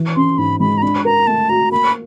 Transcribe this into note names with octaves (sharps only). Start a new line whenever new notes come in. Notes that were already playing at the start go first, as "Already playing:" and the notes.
Already playing: E3
C#4 C6
G#2 B5
G#3 B5
A#5
D4 B5
A#4 A#5
A3 A5
F#4 A#5
A#3 B5